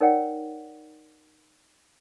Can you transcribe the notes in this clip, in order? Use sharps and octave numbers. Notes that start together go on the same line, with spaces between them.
D#4 A#4 C#5 D5 F#5 G5